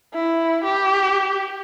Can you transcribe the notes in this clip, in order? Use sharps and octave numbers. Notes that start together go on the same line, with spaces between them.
E4
G4